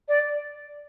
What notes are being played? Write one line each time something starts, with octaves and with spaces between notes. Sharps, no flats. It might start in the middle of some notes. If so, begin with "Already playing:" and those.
D5